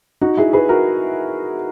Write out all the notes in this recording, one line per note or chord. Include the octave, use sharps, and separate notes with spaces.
D#4 F#4
E4 G#4
G#4 B4
F#4 A#4